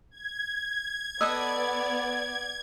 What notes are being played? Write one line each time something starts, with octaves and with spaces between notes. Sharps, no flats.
G#6
B3 A4 B4 D5 D#5 E6